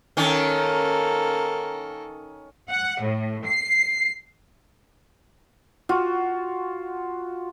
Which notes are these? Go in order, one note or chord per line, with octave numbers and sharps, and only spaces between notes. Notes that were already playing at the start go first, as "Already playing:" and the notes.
D#3 A#3 C#4 A4
F#5
A2
C7
F4 F#4